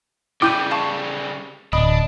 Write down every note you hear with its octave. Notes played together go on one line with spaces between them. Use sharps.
C#3 G3 E4 G5 D6 G6 D#7
F5 A5 C#6
D1 D4 D#5 B5 D#6